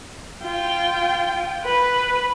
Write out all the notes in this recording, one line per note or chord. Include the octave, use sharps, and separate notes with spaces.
F4 G5
B4